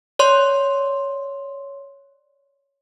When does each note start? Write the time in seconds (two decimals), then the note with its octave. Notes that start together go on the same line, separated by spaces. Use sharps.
0.19 C#5 D5 C6